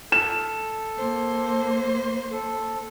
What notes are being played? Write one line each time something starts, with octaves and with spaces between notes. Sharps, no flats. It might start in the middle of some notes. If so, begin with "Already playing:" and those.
A4 E7
A#3 C5
A4